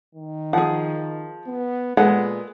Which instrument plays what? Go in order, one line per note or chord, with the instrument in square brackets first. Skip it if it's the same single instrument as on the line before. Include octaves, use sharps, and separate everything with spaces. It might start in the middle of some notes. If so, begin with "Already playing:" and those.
[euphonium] D#3
[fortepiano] F3 [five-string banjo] G#4 F#5
[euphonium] B3
[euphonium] A#2 [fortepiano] G#3 B3 [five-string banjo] A4 F#5